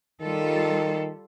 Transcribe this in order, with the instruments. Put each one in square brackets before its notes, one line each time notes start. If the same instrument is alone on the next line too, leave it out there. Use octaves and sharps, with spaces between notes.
[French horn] D#3 [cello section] G3 F4 A4